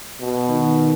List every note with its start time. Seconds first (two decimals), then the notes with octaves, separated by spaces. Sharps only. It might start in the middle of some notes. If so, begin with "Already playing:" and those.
0.20 B2
0.48 D#3